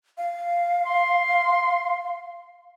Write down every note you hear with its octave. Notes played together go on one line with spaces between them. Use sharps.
F5
C6